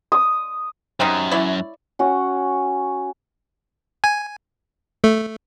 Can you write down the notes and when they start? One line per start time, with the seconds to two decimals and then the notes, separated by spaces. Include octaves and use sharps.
0.12 D#6
1.00 F#2 G3 C4 D#4
1.31 E4 C#5 D5
1.99 C#4 F#4
4.04 G#5
5.04 A3